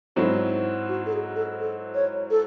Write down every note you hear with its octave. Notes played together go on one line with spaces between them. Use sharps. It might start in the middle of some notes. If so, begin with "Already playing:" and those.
G#2 F#3 C4 E4 A4
F#4
A4
G#4
A4
A4
C#5
A4